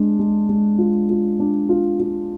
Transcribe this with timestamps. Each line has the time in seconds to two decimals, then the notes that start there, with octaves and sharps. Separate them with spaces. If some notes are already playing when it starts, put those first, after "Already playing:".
Already playing: G#3 D4
0.19 G#3
0.49 G#3
0.78 F4
1.09 F4
1.40 D4
1.69 F4
2.00 F4